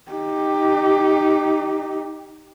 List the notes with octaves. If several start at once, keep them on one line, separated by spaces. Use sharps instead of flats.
D#4 G4